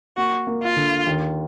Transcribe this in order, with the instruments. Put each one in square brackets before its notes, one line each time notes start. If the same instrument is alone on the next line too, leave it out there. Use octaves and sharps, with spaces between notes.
[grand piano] A#3 [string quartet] F#4
[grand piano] A#3
[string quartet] F4
[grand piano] D3
D#2